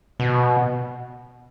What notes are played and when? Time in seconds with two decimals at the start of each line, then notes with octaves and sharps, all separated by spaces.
0.20 B2